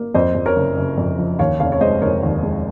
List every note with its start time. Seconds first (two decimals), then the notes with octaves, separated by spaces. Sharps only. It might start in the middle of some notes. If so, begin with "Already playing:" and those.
Already playing: A#3
0.15 F2 C5 D#5
0.35 F2
0.46 A#4 C#5
0.56 F#1
0.77 F#1
0.98 F2
1.18 F3
1.39 D#2 C#5 F5
1.60 F1 C#5 F5
1.72 C#5
1.81 G#3 C5 D#5
2.02 F1 A#4 C#5
2.23 D#2
2.43 G#3